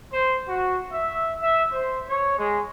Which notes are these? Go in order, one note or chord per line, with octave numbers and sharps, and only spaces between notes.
C5
F#4
E5
E5
C5
C#5
G#3